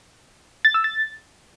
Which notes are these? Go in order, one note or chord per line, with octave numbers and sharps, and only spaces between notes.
A6
E6
A6